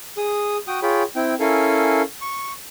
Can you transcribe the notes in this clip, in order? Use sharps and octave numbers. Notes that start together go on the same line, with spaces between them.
G#4 D#6
F#4 G5 D#6
F4 G#4 C#5 G5 B5
C4 E4 G5
C#4 E4 A4 A#4 F5 G#5
C#6